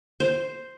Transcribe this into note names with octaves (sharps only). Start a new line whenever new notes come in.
C5